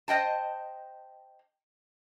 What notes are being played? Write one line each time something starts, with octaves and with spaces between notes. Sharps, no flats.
C5 D#5 G5 A5